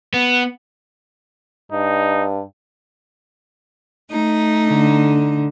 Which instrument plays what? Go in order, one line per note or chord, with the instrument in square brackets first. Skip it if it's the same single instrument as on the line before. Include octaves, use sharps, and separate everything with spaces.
[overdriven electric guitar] B3
[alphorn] G2 [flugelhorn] D#4
[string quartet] A3 D#4
[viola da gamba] D3